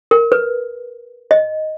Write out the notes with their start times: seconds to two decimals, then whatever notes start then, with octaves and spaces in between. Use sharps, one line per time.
0.11 A#4
0.32 B4
1.31 D#5